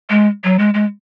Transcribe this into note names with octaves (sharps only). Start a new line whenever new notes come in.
G#3
F#3
G#3
G#3